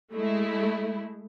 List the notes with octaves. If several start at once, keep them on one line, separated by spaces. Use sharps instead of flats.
G#3 A3 E4